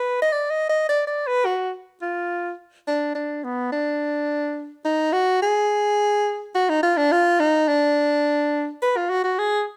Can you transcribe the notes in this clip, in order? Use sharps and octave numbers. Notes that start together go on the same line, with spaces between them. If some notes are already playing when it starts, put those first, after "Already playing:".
Already playing: B4
D#5
D5
D#5
D#5
D5
D5
B4
F#4
F4
D4
D4
B3
D4
D#4
F#4
G#4
F#4
D#4
F4
D4
F4
D#4
D4
B4
F4
F#4
F#4
G#4